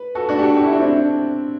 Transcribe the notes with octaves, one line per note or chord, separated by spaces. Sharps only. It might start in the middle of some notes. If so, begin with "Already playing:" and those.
Already playing: B4
F#4 A4
D4 F#4
G4
F#4 A4
F#4
E4
D4
C4 E4